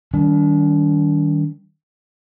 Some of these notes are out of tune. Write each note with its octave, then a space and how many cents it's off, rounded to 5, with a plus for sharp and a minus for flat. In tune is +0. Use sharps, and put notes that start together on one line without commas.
D#3 +15 G3 -5 D4 -35